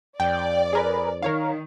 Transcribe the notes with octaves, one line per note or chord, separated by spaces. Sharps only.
F2 D5 G5
G#4 A#4 B4
D#3 A#4 C#5 F5